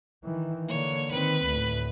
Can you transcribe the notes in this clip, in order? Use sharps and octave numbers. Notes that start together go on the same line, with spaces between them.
D#3 E3
D3 A#3 C#5
D#3 C4 B4
D2 A2